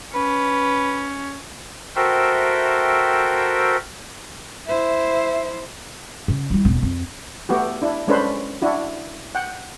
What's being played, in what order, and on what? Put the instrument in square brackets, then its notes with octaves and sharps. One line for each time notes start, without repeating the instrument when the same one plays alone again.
[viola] C#4 [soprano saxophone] B4
[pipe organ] F#4 A4 A#4 C5 E5 G5
[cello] E4 C5 [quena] E5
[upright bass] C#3
G3 E4
E1 B3
F2
[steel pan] A3 B3 F#4 G4
D4 E4
G#3 C#4 D4 A4 B4 C5
D4 E4 F#4
F#5 G5